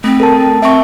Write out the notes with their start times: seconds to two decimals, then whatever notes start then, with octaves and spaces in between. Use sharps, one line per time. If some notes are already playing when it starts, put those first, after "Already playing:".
0.04 A3 C4
0.20 A4 A#4 A5
0.62 C4 E5 C#6